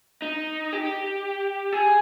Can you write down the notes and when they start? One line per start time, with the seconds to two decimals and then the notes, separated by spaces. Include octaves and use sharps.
0.22 D#4
0.73 G4
1.73 G#4